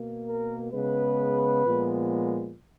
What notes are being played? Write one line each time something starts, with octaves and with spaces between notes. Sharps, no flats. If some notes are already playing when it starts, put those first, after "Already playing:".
Already playing: B2 A#3
A#4
C#3 G#3 B3 B4
A#2 F3 G#3 B3